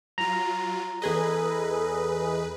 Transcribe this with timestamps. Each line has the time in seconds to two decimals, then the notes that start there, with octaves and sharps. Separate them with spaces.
0.18 F#3 F4 A#5
1.02 E2 G#4 A4 B4 D#5